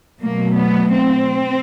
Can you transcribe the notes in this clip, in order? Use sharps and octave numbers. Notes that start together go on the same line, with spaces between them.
B2 F#3 A3 A#3
B3
C4